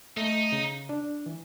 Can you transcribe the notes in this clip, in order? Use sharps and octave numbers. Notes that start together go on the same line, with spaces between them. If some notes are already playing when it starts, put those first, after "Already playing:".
A3 D#4
C#3
D4
E3